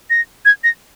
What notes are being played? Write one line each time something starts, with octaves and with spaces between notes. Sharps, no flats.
A#6
G#6
A#6